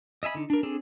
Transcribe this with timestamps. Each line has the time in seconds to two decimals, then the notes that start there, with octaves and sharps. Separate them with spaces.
0.23 D#5 E5 G#5 B5
0.35 D3 D#4
0.50 D4 A#4
0.63 C4 D4 G#4 A4